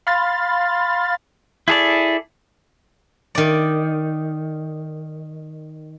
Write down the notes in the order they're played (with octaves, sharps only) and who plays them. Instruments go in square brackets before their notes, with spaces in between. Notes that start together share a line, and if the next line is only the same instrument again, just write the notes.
[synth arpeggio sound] F5 B5 C6 F6 A6
[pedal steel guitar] E4 G#4 A4 D5
[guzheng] D#3 D5